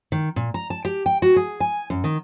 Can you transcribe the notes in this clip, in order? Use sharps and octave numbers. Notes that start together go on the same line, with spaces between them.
D#3
A#2
A#5
A5
G4
G5
F#4
G#4
G#5
F#2
D#3